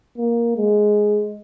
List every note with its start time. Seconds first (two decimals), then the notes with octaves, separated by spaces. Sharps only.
0.18 A#3
0.56 G#3